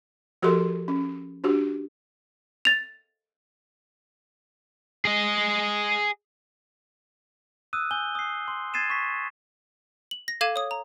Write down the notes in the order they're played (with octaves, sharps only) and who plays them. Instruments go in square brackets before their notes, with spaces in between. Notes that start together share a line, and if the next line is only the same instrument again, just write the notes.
[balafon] F3 F#4 G4 A4 A#4 C6
C#4
D4 F#4 G4
[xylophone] A6 F7
[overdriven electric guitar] G#4 D#5
[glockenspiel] D#6 E6 F#6 D#7
G#5 G6 G7
D#6 C7
C6
D#6 G#6 A6 C7 D#7 E7
C#6 B6
[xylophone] F#7
A#6
A4 F5 D6 G#6 D#7 E7
C#5 D#6
A#5